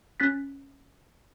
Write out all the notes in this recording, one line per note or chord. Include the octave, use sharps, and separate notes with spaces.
C#4 F#6 A6 B6